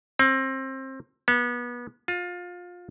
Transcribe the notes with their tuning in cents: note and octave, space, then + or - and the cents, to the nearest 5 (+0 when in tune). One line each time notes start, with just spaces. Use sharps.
C4 +25
B3 -30
F4 +25